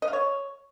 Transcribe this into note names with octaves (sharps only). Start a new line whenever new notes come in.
D#5
F5
C#5